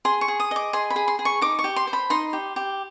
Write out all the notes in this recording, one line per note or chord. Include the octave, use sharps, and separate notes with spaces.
G#4 C6
C#6
G#4
D#6
D#5 D6
G#4 C6
B5
G#4
C6
G#4
C#6
D#4 D6
C#6
G4
C6
C5
B5
D#4 C6
G4
G4